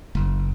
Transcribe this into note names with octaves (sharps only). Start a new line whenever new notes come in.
F#1